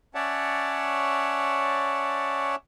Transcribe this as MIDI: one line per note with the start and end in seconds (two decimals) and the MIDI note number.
0.15 2.56 61
0.15 2.56 73
0.15 2.56 74
0.15 2.56 76
0.15 2.56 78
0.15 2.56 81